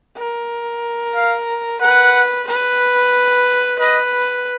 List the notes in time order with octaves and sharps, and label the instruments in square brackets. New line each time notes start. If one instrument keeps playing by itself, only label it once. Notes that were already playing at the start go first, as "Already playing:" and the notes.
[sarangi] A#4
[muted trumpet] F5
[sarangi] B4 [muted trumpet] F#5
[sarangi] B4
[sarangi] B4 [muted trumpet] D#5